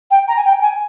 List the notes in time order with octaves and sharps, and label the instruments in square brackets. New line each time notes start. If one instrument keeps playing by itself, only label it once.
[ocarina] G5
A#5
G#5
G5
G#5